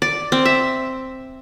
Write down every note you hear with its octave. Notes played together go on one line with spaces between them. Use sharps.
D5
C4
E5